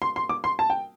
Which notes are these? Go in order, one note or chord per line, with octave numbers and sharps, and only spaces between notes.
C6
C6
D6
C6
A5
G5